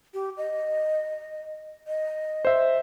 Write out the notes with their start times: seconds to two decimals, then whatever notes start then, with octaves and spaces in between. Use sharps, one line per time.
0.14 G4
0.37 D#5
1.87 D#5
2.45 C5 E5